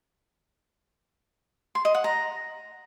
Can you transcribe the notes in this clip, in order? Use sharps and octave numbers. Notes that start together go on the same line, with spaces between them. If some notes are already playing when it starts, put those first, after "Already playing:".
C6
D#5
F#5
A#5